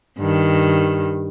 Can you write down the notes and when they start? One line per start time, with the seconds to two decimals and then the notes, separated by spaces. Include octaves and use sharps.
0.18 G2 D#3